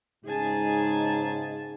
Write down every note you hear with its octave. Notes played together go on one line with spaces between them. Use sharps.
G#2 C#3 D#4 G#4 G#5 A5